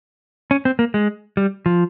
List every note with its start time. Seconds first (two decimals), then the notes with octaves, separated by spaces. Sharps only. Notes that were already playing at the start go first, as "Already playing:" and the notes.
0.51 C#4
0.65 C4
0.79 A#3
0.94 G#3
1.37 G3
1.66 F3